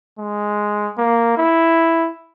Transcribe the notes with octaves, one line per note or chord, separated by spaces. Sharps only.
G#3
A#3
E4